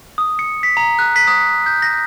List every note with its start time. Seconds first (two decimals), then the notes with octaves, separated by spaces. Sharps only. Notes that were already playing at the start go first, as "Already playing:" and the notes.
0.18 D#6
0.39 C#7
0.63 B6
0.77 A#5
0.99 F#6
1.16 B6
1.27 D#6
1.66 G6
1.82 A#6